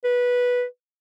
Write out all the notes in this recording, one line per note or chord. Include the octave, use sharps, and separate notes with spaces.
B4